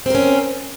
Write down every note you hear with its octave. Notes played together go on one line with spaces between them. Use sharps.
C4 C#4 A#4